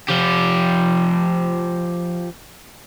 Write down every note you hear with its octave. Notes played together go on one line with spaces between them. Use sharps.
F3 G4